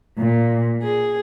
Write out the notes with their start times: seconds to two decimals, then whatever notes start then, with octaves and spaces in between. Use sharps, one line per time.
0.19 A#2
0.83 G#4